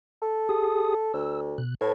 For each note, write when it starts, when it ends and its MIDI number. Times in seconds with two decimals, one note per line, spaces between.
0.22 1.10 69
0.49 0.95 67
0.49 0.95 68
0.49 0.95 87
1.14 1.58 38
1.14 1.40 88
1.58 1.75 47
1.58 1.75 90
1.81 1.92 45
1.81 1.92 71
1.81 1.92 81
1.81 1.92 92